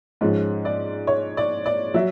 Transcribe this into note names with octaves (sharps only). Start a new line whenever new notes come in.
G#2 F3 G#3 C#4
D5
C#5
D5
D5
F#3 E5